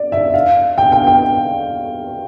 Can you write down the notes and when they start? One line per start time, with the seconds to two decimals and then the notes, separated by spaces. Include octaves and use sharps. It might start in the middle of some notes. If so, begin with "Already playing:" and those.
Already playing: D5
0.12 E5
0.34 F5
0.78 G5
0.92 G5
1.07 G5